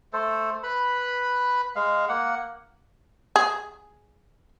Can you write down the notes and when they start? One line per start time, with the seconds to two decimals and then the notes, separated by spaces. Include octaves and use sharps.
0.13 A3 A4 C5
0.63 B4 B5
1.76 G#3 F5
2.09 A#3 F#5
3.36 G#4